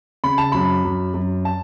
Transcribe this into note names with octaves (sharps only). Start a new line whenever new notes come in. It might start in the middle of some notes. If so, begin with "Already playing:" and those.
C#3 B5
A5
F#2 B5
F#2
F#2
A5